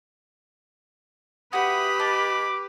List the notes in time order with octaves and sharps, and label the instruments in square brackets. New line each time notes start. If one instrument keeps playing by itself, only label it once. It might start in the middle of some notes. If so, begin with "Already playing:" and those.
[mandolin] F#4 E5 [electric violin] G4 B4 [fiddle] B5 [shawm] D#6
[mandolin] D#5 A5 [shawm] D6